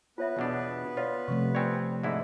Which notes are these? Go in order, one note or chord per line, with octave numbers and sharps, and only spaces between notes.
B3 F4 B4 C#5 E5
E2 B2 D4
F4 C#5 D5 F5
C3 F3 A3 C#6
C4 C#5 D5 G5 G#5
G#2 D3 E4 D#5 E5